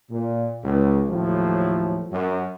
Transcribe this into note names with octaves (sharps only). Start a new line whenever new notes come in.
A#2
C#2
D#2 A2 F3 F#3
F#2